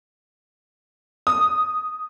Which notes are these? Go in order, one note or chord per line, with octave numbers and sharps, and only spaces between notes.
D#6